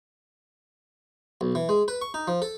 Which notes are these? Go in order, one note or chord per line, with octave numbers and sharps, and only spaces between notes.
B1
E3
G#3
B4
C#6
D#4
F3
A4